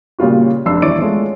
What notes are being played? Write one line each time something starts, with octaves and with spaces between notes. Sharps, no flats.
A#2 C#3 G3 F4 F#4
F1 D4 E6 C7
D#1 E3 C#5 D5 D7
G#3 A3 C#4 F4